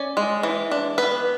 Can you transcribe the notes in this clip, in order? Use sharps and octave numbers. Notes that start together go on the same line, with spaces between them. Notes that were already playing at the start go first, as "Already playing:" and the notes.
Already playing: C#4 D5
G#3
E3
D4
B3 B4